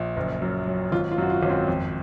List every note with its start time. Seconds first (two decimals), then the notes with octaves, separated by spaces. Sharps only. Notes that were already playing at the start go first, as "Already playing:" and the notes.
Already playing: A#1 A#2
0.17 F#1
0.42 F#2
0.67 F#3
0.92 G#1 F4
1.12 F4
1.18 F#2 F#4
1.30 F4
1.43 G#1 C#4
1.49 C4
1.68 F2